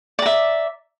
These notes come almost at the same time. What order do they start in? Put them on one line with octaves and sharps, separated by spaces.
D5 A#5 E5